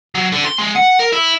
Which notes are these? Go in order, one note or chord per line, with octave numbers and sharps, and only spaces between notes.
F#3
D3
C6
G#3
F#5
A#4
E4